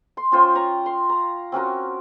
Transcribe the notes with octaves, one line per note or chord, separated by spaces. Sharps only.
C6
C#4 F4 C5 G5
C#5 A#5 C#6
C6
A#5
C4 C#4 F#4 A#4